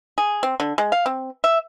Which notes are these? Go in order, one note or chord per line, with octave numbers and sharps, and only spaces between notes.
G#4
C4
D3
G#3
F5
C4
E5